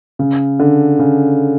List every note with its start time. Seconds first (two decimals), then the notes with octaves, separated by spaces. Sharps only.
0.19 C#3
0.59 D3
0.99 C#3